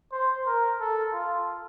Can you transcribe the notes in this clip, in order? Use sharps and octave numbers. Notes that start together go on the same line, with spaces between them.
C5
A#4
A4
F4